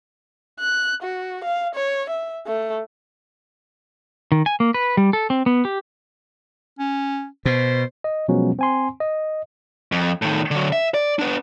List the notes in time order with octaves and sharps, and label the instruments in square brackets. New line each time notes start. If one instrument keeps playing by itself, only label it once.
[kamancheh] F#6
F#4
F5
C#5
E5
A3
[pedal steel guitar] D#3
G#5
A#3
B4
G3
A4
C4
B3
G4
[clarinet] C#4
[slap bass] B2 [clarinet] C5
[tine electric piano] D#5
B2 F3 F#3 G#3 B3 C#4
C4 G#5 C6
D#5
[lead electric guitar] F2
A2 D#3
D3 F#3
E5
D5
B3 D4